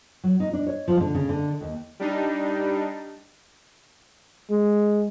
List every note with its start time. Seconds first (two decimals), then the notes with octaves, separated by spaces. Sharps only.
0.24 F#3
0.40 D#4
0.53 D4
0.67 C#5
0.88 F3
1.00 D3
1.15 C#3
1.29 D3
1.61 D#2
2.00 G3 D4 D#4
4.51 G#3